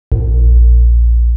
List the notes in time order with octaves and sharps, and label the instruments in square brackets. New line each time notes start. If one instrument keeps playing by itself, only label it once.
[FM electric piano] A#1